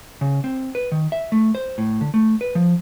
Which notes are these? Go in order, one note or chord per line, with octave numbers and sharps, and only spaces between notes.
C#3
C4
B4
D#3
E5
A3
C5
A2
D3
A3
B4
F3